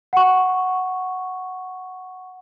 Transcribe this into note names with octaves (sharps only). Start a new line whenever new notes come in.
F#5 C#6